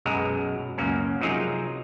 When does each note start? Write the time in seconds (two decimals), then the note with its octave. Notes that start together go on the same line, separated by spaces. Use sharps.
0.05 B1 F#2 B2 F#3 G#3 A#5
0.78 C#2 F#2 A#3 C#4
1.21 C3 F3 F#3 D#4 G#4 A#4